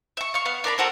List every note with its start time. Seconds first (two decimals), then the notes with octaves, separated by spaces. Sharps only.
0.17 E5 C#6
0.34 F5 C#6
0.45 B3 F5
0.64 D4 A#4 D5 B5
0.78 C4 F#4 A4 A#4